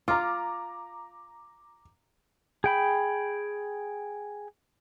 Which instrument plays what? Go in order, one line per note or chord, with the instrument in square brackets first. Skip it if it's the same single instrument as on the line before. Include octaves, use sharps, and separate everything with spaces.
[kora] F4 [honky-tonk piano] A#5 D6
[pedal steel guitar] G#4 G5 B5